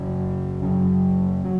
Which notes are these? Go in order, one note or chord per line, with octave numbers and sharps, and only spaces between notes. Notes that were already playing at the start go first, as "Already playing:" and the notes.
Already playing: F#2 C#3 F#3
F#2 C#3
F#3